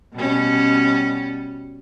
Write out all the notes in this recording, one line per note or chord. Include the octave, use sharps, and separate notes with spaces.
B2 G3 C#4